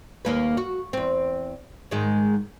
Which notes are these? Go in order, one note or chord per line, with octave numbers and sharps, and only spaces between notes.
D#2 A#3 B4
F#4
E2 C4
G#2 D#3 G#3